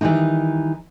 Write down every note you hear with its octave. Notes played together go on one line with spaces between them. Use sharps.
D#3 E3 G3 G#3 A#3 D#4